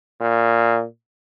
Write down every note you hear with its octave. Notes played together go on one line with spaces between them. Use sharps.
A#2